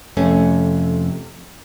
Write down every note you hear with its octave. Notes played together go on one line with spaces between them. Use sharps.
F2 C3 A3 C#4